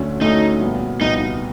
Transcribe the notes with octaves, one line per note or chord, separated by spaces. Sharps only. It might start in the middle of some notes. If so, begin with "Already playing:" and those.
Already playing: D2 D3 F#3 A3 C#4
D2 D3 F#3 A3 C#4 D#4
C2 A#2 F#3 B3
C2 A#2 F#3 B3 D#4